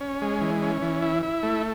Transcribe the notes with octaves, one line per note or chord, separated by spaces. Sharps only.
C#4
G#3
E3
C#4
E3
E4
E4
A3